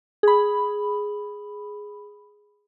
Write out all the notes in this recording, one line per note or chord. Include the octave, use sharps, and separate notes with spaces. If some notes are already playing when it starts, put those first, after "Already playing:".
G#4 B5